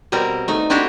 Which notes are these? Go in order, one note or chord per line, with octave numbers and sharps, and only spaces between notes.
B2 G3 C4 A#4
A3 D#4
C4 D4 E4 F#4 G4